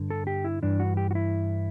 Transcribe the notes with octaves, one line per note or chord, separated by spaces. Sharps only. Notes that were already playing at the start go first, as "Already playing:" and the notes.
Already playing: G2 D3
A4
G4
E4
G2 E3 D4
F#4
G4
F#4
E4